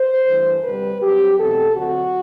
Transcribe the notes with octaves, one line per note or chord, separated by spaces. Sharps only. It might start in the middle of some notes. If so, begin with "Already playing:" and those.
Already playing: C5
G2 E3 A3
D2 C3 G3 B4
G2 F#3 C4 G4
E2 B2 A3 C4 A4
D2 D3 F#3 C4 F#4